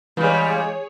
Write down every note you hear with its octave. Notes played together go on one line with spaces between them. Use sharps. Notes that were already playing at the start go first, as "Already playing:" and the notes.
C#3 E3 G3 G#3 G#4 C#5